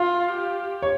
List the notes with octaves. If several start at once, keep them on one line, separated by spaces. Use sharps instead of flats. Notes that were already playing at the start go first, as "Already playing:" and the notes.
Already playing: F4 F5
G4
C#5